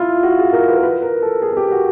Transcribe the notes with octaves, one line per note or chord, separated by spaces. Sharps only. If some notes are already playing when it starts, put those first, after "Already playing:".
Already playing: E4 F4
F#4
G#4
A#4
B4
A#4
B4
A#4
A4
G#4
G#4
G4
F#4